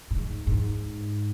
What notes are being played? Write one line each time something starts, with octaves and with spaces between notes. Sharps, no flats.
A2
G#2
G#2